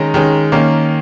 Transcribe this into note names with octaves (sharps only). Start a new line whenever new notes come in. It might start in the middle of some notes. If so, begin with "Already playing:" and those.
Already playing: D#3 G#3 C#4 A#5
D#3 G#3 C#4
D#3 A#3 C#4